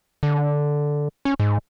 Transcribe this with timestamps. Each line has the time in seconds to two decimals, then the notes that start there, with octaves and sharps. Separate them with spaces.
0.23 D3
1.25 C#4
1.40 G#2